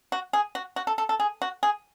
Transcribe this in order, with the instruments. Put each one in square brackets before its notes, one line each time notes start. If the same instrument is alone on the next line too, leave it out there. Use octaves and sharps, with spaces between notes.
[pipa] F#4
G#4
F#4
F#4
A4
A4
A4
G#4
F#4
G#4